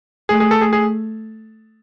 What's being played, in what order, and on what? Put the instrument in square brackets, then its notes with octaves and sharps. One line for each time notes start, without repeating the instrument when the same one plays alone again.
[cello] A3 [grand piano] G#4
[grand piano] G#4
A4
G#4
G#4